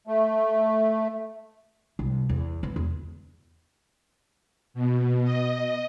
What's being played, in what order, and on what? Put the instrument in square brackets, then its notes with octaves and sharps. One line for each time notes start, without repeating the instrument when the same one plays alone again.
[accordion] A3
[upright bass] C2
E2
B3
E2
[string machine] B2
D#5